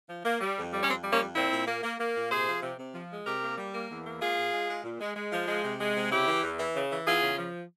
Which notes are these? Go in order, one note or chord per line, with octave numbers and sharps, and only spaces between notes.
F3
A#3
G3
F2
G3
C#4
F2 C4
G3
A#3 C#4
F2
A#2 C4 E4
A#2
A#3
A#3
A#3
A#2
C3 G#4 C5
F3
C3
C3
F3
G#3
C3 G4 A#4
A#3
G3
A#3
E2
A#3
G#3 F4 G#4
A#2
G#3
G#3
A#2
G#3
G#3
F3
G#3
C3
G#3
C3
C#3 E4 G4
E3
E2
E3
C#3
E3
E2 F4 G#4
C#3
F3